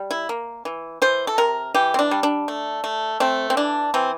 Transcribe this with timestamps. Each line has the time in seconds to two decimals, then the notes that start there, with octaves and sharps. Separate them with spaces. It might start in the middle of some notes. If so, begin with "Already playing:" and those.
Already playing: G3
0.11 E4
0.29 A#3
0.65 E3
1.02 E3 C5
1.27 A4
1.38 C3 A#4
1.74 E3 G4
1.94 C4
1.99 D4
2.11 G3
2.23 D4
2.48 A3
2.84 A3
3.20 A3 C4
3.50 C4
3.57 E3 D4
3.94 E3 C4